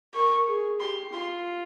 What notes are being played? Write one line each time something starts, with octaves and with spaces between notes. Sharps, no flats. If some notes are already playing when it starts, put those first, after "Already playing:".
A#4 C#6
G#4
G4 C6
F4 C6